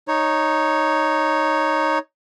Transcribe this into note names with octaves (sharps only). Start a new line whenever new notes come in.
D#4 C#5